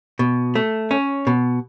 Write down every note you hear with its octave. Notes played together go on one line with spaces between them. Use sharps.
B2
A3
C#4
B2